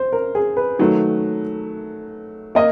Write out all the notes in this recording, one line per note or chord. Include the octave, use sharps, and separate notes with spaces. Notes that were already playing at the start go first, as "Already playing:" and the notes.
Already playing: C5
A#4
G#4
B4
D#3 F#3 A3
A#3 D#5